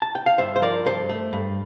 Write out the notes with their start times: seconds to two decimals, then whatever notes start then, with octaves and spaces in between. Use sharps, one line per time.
0.02 A5
0.15 G5
0.26 F5
0.38 G2 C5 E5
0.56 C5
0.62 F3 A#4 D5
0.86 G2 A4 C5
1.09 A3
1.33 G2